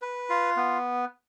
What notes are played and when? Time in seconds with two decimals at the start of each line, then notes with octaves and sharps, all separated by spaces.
0.02 B4
0.30 F4
0.57 B3